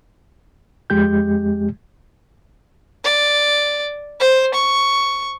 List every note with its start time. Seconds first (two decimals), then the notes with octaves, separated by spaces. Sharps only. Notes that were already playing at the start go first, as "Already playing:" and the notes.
0.90 F2 G#3 G4 G6
3.04 D5
4.20 C5
4.54 C#6